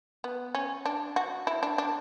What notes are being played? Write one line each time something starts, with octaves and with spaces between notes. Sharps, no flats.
B3
C#4
D4
F#4
E4
D4
D4